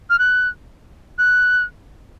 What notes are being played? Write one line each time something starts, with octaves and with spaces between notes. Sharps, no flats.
F6
F#6
F#6